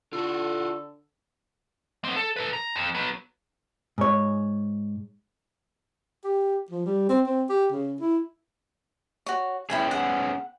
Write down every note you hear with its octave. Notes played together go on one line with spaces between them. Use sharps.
D3 F4 F#4 A4
B3 C4
A4
A4 B4
A#5
F2
F#3 B3
G#2 C#5
G4
F3
G3
C4
C4
G4
C#3
E4
F#4 C#5
B3 C#4 E4 G#4 G5 G#5
F#5